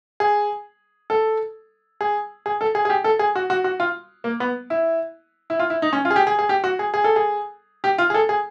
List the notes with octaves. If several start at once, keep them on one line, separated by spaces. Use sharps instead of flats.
G#4
A4
G#4
G#4
A4
G#4
G#4
G4
A4
G#4
F#4
F#4
F#4
F4
A#3
B3
E4
E4
F4
E4
D#4
C#4
F4
G#4
G4
G#4
G#4
G4
F#4
G#4
G#4
A4
G#4
G4
F4
G#4
A4
G#4